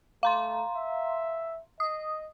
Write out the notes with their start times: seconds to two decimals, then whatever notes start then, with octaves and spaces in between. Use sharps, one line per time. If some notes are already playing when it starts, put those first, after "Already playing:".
0.23 A3 F5 A#5 C6
0.75 E5
1.80 D#5 D#6